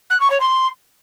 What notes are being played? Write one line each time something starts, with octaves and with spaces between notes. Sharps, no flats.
F#6
C#6
C#5
C6